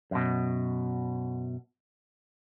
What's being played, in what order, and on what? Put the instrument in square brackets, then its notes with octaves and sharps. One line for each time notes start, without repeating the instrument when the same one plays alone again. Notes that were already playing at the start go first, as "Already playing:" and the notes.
[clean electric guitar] F#2 B2